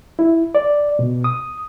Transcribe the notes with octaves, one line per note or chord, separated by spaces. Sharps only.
E4
D5
B2
D#6